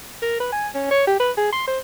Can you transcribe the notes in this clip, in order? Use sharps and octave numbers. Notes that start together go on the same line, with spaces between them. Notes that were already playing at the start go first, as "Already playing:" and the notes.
A#4
B4
G#5
C#4
C#5
G4
B4
G#4
C6
C5